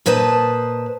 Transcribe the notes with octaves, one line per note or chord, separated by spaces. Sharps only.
A#2 B4 C5 D#5 A5